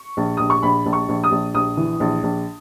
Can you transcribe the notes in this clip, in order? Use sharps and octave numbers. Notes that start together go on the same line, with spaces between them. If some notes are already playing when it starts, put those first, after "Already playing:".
Already playing: C#6
A#1
A#1 D#6
C#6
A#1 B5
A#1
C#6
A#1
D#6
A#1
A#1 D#6
E3
A#1
A#1